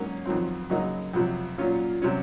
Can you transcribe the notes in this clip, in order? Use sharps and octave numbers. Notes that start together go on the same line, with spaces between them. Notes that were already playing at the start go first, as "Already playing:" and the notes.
Already playing: G#2 F#3 A#3 C#4
F2 D#3 F#3 C4
F#2 C#3 F#3 A#3 D#4
F2 C3 F#3
A#2 F#3 C#4 F4
C3 F#3 C#4